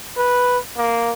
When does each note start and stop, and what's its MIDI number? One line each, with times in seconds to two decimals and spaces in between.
0.17 0.58 71
0.77 1.13 58